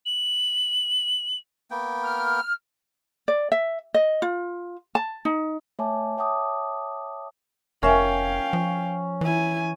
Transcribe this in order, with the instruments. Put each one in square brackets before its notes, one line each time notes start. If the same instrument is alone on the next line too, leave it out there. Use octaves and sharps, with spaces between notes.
[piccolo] F#7
[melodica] A#3 B3 G5
[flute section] F6
[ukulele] D5
E5
D#5
F4
A5
D#4
[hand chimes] A3 C#5 E5 G#5 A5 D6
C#5 E5 G5 A5 D6 D#6
[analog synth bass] F1 [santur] C#4 [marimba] A#4 E5 G#5 [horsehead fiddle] F5 G5
[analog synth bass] F3
[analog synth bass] E3 [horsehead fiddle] E4 G#5